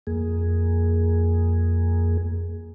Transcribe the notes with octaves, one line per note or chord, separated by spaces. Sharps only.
F2 A#3 G#4